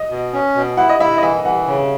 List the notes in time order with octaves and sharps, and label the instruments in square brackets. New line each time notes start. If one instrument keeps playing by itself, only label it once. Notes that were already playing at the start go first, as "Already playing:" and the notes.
Already playing: [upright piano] D#5
[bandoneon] B2
C#4
B2
[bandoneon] E4 [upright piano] F#5
[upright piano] D#5
[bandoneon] E4 [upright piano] E5
[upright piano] D#5
[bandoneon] E3 [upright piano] E5
[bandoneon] E3 [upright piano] F#5
[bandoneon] C#3